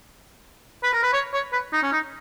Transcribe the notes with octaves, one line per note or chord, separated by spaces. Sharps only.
B4
A#4
B4
C#5
C#5
B4
D#4
C#4
D#4